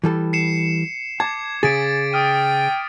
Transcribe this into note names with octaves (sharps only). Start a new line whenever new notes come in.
E3 G3 A4
C7 C#7 E7
A5 D6 G#6
C#3 G#4 A6 B6 D7
G5 D#6 F6 D#7